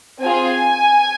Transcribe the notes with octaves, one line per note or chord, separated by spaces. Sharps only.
C4 F4 G#4 G#5